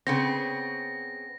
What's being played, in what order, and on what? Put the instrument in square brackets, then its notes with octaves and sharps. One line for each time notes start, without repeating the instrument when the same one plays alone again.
[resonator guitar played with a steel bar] C#3 B3 C4 [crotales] A#6